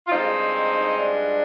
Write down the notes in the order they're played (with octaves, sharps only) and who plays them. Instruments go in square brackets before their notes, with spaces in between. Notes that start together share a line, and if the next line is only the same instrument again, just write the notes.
[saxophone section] F4
G2 F3 G#3 C4 D#4
D4